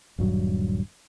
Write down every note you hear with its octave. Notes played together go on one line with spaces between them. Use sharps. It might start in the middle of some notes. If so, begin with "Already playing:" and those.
D#1 G2 F#3